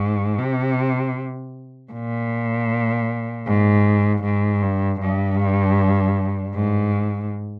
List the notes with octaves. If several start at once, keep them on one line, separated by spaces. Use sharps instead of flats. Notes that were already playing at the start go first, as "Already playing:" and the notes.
Already playing: G#2
C3
A#2
G#2
G#2
G2
G2
G#2